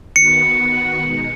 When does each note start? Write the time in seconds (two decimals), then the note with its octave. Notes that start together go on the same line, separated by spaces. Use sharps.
0.15 D#3 B3 F#4 B4 C#7
0.99 B2 G#3 D#4